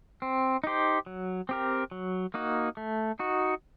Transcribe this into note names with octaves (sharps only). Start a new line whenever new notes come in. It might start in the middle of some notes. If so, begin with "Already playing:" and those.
C4
D#4 G4 C5
F#3
C4 G4 A#4
F#3
A#3 D#4 F#4
A3
D#4 F#4